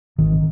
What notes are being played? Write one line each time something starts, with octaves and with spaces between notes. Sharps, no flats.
G#1 D#3